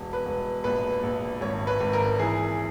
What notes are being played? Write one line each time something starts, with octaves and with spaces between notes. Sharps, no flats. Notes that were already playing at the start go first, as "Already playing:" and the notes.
Already playing: E1
B4
E1
A#1 B4
A#1
G#1 C#5
B4
G#1
A#4
E3 G#4